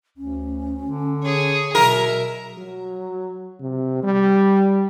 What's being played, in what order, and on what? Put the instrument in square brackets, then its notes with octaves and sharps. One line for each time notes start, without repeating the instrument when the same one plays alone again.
[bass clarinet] D2 [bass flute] C#4
[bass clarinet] D3
[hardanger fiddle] G#4 C#5
[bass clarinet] B2 [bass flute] F#3 [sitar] A#4 [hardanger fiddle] E5
[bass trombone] F#3
C3
G3